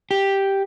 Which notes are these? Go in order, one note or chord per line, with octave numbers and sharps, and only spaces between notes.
G4